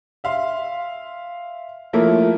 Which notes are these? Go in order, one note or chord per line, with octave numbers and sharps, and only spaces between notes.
E5 F5 C6
F3 A3 A#3 E4 A#4 C#5